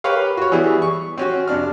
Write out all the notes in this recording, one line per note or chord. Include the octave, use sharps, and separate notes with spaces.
G4 A#4 B4 C#5 F5
F#4 C#5
E3 G3 B3 E4 G#4
C#6
C4 C#4 F#4
F2 C3 D4 F6